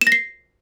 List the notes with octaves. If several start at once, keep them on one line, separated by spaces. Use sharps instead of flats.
E7
A#6
C7